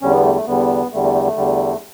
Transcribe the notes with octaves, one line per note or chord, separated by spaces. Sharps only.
E2 D3 G3 C#4
B3
A3
A3
E2 D3 G3 B3
E2 D3 G3 A3
A3
A3
A3
E2 D3 G3